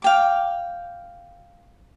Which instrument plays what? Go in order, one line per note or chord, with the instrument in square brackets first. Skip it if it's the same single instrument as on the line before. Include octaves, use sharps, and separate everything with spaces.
[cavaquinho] F5 G5 D6